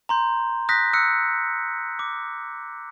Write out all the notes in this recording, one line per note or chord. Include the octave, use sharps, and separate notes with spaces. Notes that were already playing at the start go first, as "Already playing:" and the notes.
A#5 C6 G6
D#6 F#6 G6 A#6 B6
D#6 E6 F#6 C#7
D6